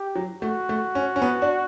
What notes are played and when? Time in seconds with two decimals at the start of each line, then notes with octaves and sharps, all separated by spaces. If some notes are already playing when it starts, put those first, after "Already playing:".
Already playing: G4
0.15 F#3
0.42 A3 F#4
0.69 A3
0.95 C#4
1.16 C#4
1.22 B3
1.42 D4